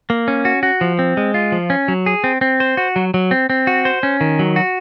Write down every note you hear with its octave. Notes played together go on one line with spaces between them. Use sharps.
A#3
C#4
F#4
F#4
F3
C4
G#3
F4
F3
C#4
F#3
G#4
C4
C4
C5
F#4
F#3
F#3
C4
C4
F#4
C5
C#4
D#3
F#3
F#4